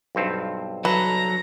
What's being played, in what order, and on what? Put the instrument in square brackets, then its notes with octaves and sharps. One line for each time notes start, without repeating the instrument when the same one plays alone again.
[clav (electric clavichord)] B1 G2 C4
[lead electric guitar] F#3 A4 [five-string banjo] B4 [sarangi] A#5